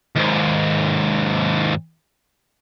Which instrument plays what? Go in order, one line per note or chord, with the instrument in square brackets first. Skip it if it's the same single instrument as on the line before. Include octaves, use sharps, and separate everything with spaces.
[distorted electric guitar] D#2 G#2